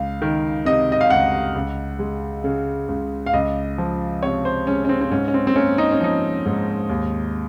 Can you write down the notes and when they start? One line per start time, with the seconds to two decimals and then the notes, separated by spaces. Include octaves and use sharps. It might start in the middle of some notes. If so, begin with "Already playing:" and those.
Already playing: C#2 F5
0.22 D#3
0.65 C3 D#5
0.92 D#5
1.01 F5
1.10 C#2 F#5
1.55 C#2
1.99 G#3
2.44 C#3
2.89 C#2
3.26 F5
3.33 C#2 D#5
3.78 F3
4.23 C3 C#5
4.45 C5
4.67 G#3 C#4
4.85 C#4
4.89 C4
5.01 C4
5.11 G#2 C#4
5.28 C#4
5.34 C4
5.47 C4
5.56 A#3 C#4
5.78 D#4
5.92 C#4
6.01 F3 D#4
6.46 G#2
6.89 D#2